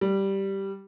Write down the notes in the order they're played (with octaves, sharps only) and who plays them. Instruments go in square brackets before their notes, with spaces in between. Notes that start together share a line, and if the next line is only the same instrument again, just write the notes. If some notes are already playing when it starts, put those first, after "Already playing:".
[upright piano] G3